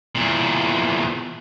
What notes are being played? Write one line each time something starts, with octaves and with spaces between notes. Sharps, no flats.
E2 A#2